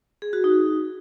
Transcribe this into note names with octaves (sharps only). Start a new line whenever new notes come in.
G#4
F#4
D#4